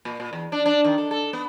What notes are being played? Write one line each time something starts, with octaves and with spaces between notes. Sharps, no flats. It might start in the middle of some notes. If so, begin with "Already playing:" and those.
A#2
A#2
E2
D4
D4
D#3
A4
A4
B3